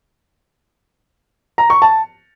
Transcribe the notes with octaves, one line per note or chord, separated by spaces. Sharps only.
A#5
C#6
A5